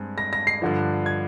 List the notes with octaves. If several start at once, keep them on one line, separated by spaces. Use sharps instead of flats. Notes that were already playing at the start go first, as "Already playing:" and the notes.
Already playing: G2 G#3 C4
A#6
A#6
C7
G2 D3 F3
G#6